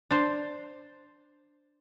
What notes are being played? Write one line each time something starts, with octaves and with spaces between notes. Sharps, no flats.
D4 C5